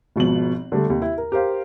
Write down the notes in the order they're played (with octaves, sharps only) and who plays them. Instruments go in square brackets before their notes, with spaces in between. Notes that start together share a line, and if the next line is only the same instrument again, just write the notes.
[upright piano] G#1 B2 F3 F#7
D3 G3 A3
D#2 C3
E4
A#4
G4 A#4 C5 F5